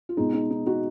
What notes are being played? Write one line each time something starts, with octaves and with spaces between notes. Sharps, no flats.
F4
B2 G#3 D#4
D#4
D#4
D#4 F#4